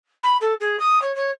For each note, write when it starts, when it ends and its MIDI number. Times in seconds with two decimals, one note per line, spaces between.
0.23 0.37 83
0.41 0.53 69
0.60 0.79 68
0.79 1.01 87
1.01 1.14 73
1.15 1.30 73